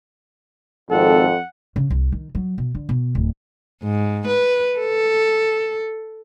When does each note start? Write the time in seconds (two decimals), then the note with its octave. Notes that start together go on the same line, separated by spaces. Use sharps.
0.91 G#1 F2 A4 F#5
1.76 C#3
1.90 C2
2.12 D#3
2.35 F#3
2.58 B2
2.75 D3
2.89 B2
3.15 D1
3.83 G#2
4.27 B4
4.80 A4